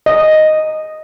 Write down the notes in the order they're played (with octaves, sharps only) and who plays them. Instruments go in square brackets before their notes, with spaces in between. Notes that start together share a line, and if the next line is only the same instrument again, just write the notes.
[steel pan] D#5